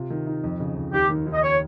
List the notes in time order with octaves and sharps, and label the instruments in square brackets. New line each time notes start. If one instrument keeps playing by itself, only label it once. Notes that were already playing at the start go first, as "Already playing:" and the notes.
Already playing: [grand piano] C3 F4
D#3
D#4
F2
C#3
F2
[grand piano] D#2 [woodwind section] G4
[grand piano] D#3
D#2
[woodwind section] D#5
C#5